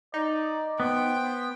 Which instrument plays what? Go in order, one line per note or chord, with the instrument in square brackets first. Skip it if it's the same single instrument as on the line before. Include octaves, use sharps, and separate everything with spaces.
[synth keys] D#4 [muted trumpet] D5
[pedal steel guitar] B3 [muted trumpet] C5 [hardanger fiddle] G5